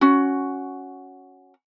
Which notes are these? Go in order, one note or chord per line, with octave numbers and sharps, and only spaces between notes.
C#4 F#4